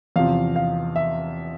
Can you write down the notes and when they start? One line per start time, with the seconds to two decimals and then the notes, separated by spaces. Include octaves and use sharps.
0.16 E2 C3 F3 F5
0.56 F5
0.96 E5